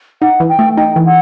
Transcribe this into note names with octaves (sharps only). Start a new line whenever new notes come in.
D#4 F#5
E3
G5
A3
D#4 G5
E3
F#5